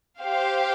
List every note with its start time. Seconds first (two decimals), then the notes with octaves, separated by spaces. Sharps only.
0.19 G4 C5 F5